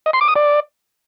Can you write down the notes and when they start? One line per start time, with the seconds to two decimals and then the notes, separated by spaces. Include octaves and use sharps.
0.06 D#5
0.13 C6
0.21 D6
0.28 D#6
0.36 D5